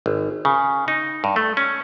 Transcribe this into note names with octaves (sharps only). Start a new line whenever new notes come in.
G#1
C#3
D#4
G2
A3
C#4